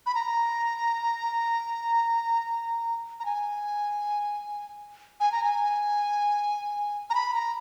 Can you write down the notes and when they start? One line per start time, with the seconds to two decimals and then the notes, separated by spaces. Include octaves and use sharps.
0.06 B5
0.15 A#5
3.20 A#5
3.26 G#5
5.20 G#5
5.32 A#5
5.44 G#5
7.10 A#5
7.15 B5
7.34 A#5